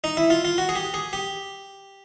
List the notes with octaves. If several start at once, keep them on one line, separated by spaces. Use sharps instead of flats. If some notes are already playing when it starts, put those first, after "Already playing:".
D#4
E4
F4
F4
F#4
G#4
G4
G#4
G4